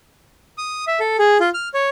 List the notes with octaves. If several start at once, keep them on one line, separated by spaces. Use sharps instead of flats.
D#6
E5
A4
G#4
F4
F6
C#5